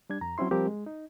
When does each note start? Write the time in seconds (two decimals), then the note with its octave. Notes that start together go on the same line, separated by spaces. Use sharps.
0.10 G3 D4 G#6
0.21 F2 A#5
0.38 F#3 C4 C#4 E4 C6
0.51 F3 G3 C4 G4 A#4
0.67 G#3
0.86 D#4